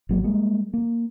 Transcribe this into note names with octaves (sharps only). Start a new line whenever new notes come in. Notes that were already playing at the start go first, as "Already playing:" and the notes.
G#1 F#3 A#3
G3 G#3 A#3
A#3